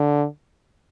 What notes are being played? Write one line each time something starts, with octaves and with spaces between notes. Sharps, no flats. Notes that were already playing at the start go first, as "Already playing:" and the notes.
Already playing: D3